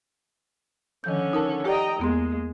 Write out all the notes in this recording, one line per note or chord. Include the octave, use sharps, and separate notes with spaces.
D3 D#3 F3 C#4 G6
D#4 A#4 A5
G4 D5 D#5 G5 A#5
E2 G#3 A#3 B3 C6